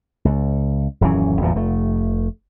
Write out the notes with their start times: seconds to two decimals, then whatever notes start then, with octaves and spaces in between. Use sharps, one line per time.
0.25 C#2
1.01 D#1 F#2 E3 C#4
1.41 G#1 E2 A#2 F3
1.55 F1 A3